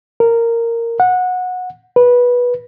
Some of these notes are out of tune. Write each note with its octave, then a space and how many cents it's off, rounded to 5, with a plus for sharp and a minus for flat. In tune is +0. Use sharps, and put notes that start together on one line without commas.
A#4 -10
F#5 -20
B4 -15